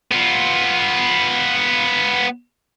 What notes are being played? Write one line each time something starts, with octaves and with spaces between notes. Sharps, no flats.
B3 F4